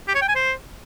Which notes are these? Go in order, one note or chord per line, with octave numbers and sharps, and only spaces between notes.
G4
C#5
G5
G#5
C5